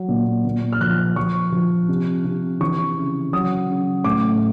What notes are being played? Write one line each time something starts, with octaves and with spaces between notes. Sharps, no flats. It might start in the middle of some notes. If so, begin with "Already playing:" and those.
Already playing: F#3
A#2
A#2
F6
F3 F#6
F3 C#6
F3
C3
C3
E3 C#6
C#3
F#3 D#6
C#3
A2 D6